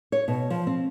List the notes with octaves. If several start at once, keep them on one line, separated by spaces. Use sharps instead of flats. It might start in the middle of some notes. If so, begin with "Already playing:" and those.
C#5
B2
F3
C4